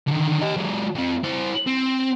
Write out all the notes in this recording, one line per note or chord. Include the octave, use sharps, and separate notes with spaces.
D3 D#3
G4 D#5
F#3 G#3
F2 C4
E4 C5
C4